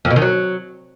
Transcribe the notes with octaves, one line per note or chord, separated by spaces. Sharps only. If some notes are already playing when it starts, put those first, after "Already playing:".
F2
B2
D#3
F#3